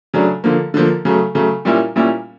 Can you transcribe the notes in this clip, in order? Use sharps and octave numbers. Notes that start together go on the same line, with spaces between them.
C#3 F#3 A3 D4
D3 F3 A#3
D3 F3 A#3
C#3 F#3 A3
C#3 F#3 A3
A#2 G3 A#3 C#4 E4
A#2 G3 A#3 C#4 E4